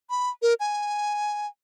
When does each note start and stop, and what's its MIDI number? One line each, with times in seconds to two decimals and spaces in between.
0.10 0.30 83
0.42 0.54 70
0.60 1.47 80